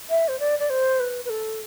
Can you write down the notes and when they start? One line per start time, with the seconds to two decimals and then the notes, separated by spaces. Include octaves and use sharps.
0.10 E5
0.28 C5
0.40 D5
0.59 D5
0.70 C5
1.00 B4
1.25 B4
1.30 A4